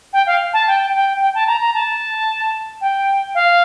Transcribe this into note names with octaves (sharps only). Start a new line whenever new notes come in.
G5
F5
A5
G5
G5
G5
A5
A#5
A#5
A5
G5
F5